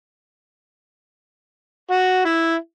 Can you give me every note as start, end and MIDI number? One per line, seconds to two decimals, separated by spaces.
1.91 2.25 66
2.25 2.55 64